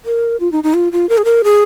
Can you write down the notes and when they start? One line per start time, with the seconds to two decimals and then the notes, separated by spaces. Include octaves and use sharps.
0.05 A#4
0.40 F4
0.52 D#4
0.64 D#4
0.74 F4
0.92 F4
1.09 A#4
1.18 G#4
1.25 A#4
1.44 G#4